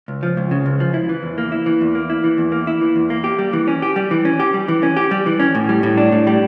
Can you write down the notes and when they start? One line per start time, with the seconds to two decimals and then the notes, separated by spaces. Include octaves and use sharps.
0.08 C#2
0.23 F3
0.37 C#2
0.51 C#3
0.66 C#2
0.80 F3
0.94 E4
1.09 E3
1.23 E2
1.38 A#3
1.52 E4
1.66 E3
1.81 E2
1.95 A#3
2.10 E4
2.24 E3
2.38 E2
2.52 A#3
2.67 E4
2.81 E3
2.96 E2
3.10 A#3
3.24 G4
3.39 G3
3.53 E3
3.68 C#4
3.82 G4
3.96 G3
4.11 E3
4.25 C#4
4.40 G4
4.54 G3
4.68 E3
4.83 C#4
4.97 G4
5.11 G3
5.26 E3
5.40 C#4
5.55 A2
5.69 G3
5.83 A2
5.97 D4
6.12 A2
6.27 G3